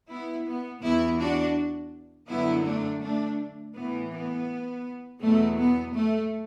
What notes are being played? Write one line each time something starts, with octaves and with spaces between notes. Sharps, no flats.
B3 E4
B3
E2 E3 B3 E4
D4 F#4
F#2 D3 F#3 B3 E4
A3 D4
A3 D4
A2 E3 B3
B3
E2 B2 F#3 A3
B3
A3